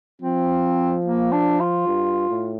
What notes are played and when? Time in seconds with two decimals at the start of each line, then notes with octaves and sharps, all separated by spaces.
0.22 F3 C4
1.05 A#3
1.32 D4
1.60 F4
1.87 G2
2.29 A2